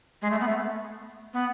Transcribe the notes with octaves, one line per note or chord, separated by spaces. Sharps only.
G#3
A3
B3
A3
B3